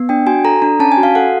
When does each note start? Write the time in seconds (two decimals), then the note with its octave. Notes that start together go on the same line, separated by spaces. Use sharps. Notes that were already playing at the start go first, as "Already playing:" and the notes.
Already playing: B3
0.09 D4 G5
0.26 F#4 G#5
0.45 A4 A#5
0.62 D4 A#5
0.80 C#4 A5
0.92 G#5
0.97 F#4
1.03 F5
1.15 A4 F#5